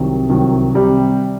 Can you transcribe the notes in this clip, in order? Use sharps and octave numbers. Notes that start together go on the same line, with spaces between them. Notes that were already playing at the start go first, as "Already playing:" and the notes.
Already playing: C2 C3 D#3 F#3
C2 C3 D#3 F#3
C3 G3